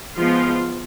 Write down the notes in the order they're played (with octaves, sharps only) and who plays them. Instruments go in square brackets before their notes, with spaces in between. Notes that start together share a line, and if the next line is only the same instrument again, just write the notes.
[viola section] F3 G#3 B3 F4